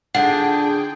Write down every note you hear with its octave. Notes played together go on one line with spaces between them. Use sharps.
D3 D4 F4 G#4 F#5 G5